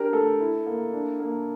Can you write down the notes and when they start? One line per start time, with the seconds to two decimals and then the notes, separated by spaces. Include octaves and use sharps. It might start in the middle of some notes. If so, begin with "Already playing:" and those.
Already playing: D4 G4 A#4
0.13 A3 A4
0.40 E4
0.66 A#3
0.93 D4
1.20 A#3